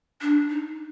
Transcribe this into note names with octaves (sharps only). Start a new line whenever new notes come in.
D4
D#4